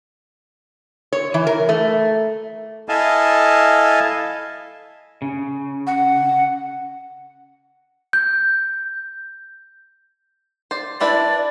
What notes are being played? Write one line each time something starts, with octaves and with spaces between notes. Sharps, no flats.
C#5
E3
A#4
A3
E4 A4 D#5 F5 G#5 A5
C#3
F#5
G6
C5 D5
D4 E4 B4 D5